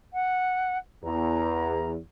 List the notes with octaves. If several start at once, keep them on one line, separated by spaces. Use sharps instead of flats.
F#5
E2 A#5